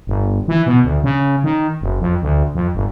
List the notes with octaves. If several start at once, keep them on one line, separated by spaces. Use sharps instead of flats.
G1
E3
B2
D2
C#3
D#3
F#1
F2
D2
F2
G1